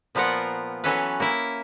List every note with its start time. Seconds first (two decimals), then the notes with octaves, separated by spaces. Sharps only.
0.15 A#2 F3 B3 F4 A#4 F#5
0.84 E3 F#3 C#4 A4 B4
1.20 A#3 E4